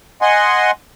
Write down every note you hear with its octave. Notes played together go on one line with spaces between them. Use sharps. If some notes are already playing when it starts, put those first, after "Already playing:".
D#5 F#5 G#5 C6